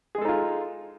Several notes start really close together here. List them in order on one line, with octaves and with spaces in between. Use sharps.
G#4 G#3 A4 D#4 F4